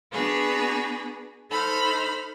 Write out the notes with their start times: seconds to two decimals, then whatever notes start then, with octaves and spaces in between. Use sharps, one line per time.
0.11 B3 D4 F#4 G#4 B4
1.50 D#4 A4 C5 B5 F6